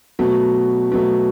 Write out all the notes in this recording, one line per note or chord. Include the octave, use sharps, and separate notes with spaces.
B2 F#3 A3
B2 F#3 A3